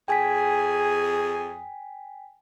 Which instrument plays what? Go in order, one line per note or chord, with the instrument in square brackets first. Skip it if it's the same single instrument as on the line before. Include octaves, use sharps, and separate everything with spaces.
[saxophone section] F2 G#4 [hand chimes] G5 G#5 B6